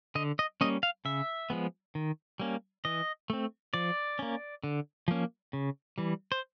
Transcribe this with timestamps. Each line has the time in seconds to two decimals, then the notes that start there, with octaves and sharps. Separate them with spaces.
0.15 D3 D#5
0.39 D#5
0.61 G3 A#3 C#4 D#5
0.83 F5
1.05 C#3 E5
1.50 F3 G#3 B3
1.95 D#3
2.40 G3 A#3 C#4
2.85 E3 D#5
3.30 A3 C4
3.74 F3 D5
4.19 A#3 C#4
4.64 D3
5.08 F3 A#3 C#4
5.53 C#3
5.98 E3 G3
6.32 C5